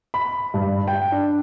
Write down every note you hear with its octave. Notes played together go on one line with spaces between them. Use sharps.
B5
G2
G5
D4